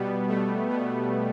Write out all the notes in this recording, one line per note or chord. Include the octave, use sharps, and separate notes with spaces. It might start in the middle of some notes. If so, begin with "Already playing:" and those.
Already playing: B2 G3 B3
A3
B3